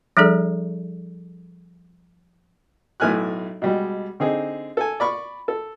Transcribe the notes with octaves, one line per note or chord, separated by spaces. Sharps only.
F3 G3 D4 G#4 A4 D5
B1 A2 A3 G#5 F6 F#6
B2 G3 G#3
D3 C4 D#4 G#4
A4 G#5
D5 B5 C#6
A4